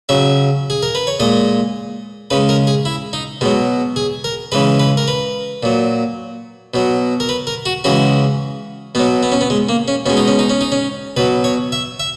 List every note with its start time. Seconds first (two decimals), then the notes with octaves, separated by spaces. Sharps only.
0.09 C#3 F#3 E5
0.70 G#4
0.83 A#4
0.95 B4
1.07 C#5
1.20 A#2 G#3 D#5
2.30 C#3 G#3 B4
2.49 A#4
2.67 G#4
2.85 E4
3.13 D#4
3.41 B2 G#3
3.45 F#3
3.96 G#4
4.24 A#4
4.52 C#3 E3 G#3 B4
4.80 B4
4.97 A#4
5.08 B4
5.63 A#2 F#3
6.74 B2 F#3
7.20 A#4
7.29 B4
7.47 A#4
7.66 F#4
7.84 C#3 E3 G#3 F#4
8.95 B2 B3
8.99 F#3
9.23 B3
9.32 C#4
9.41 B3
9.50 G#3
9.69 A#3
9.88 C#4
10.06 B2 G#3 C#4
10.17 D#4
10.28 C#4
10.39 D#4
10.50 C#4
10.61 D#4
10.72 C#4
11.17 B2 F#3 B4
11.44 C#5
11.72 E5
12.00 E5